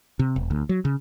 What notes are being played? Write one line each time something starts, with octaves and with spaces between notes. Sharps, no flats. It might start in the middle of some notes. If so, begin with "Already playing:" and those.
C3
E1
D2
F#3
C#3